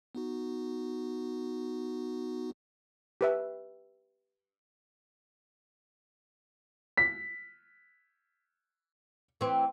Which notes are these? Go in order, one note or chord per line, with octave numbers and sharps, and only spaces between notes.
B3 D#4 F#4
G4 B4 E5
B6
E3 C4